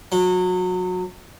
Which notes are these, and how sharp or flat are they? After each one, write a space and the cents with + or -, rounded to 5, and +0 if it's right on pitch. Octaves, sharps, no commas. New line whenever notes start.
F#3 -25